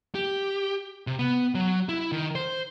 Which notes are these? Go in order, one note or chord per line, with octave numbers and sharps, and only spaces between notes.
G4
C3
B3
F#3
E4
D#3
C5